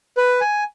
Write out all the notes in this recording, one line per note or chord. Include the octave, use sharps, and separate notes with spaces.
B4
G#5